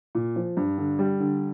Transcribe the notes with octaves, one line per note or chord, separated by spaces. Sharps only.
A#2
F3
G2
D3
G3
D3